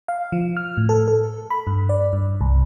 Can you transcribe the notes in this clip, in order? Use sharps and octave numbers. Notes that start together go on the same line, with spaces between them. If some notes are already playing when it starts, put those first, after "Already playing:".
F5
F3
F6
A2
A4
A4
B5
G2
D5
G2
C2